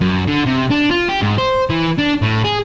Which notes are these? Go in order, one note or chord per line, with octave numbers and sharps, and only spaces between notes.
F#2
D3
C3
D4
F4
G4
G#2
C5
E3
D4
A2
G#4